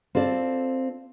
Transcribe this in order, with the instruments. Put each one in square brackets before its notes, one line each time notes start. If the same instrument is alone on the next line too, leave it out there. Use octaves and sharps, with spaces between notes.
[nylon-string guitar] C4 F4 A4 D5